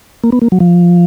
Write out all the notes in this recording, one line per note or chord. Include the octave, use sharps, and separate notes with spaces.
A#3
B3
A#3
F#3
F3